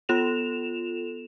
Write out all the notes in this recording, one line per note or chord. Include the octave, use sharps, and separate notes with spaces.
B3 F4 A4 E7 F7